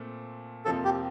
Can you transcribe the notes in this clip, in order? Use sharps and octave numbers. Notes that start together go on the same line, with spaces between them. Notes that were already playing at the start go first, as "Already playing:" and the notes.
Already playing: A#2 A3 C4
F2 C3 F3 A#3 A4
G4